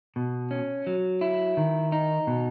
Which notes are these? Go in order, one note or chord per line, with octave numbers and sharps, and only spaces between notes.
B2
C#4
F#3
E4
D#3
D#4
B2